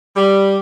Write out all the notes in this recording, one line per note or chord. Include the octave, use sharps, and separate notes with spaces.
G3